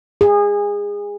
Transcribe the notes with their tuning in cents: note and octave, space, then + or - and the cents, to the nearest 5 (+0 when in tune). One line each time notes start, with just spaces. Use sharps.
G#4 -25